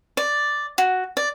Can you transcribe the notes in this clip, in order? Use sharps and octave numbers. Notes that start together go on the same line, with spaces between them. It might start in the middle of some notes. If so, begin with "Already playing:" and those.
D5
F#4
D5